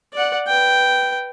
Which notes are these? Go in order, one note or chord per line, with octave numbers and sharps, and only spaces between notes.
D5 F#5
B4 G5